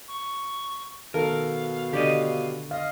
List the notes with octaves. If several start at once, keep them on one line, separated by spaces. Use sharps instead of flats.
C#6
B2 D#3 A4 A#4 F5
D3 G4 D5 D#5
D#5 F5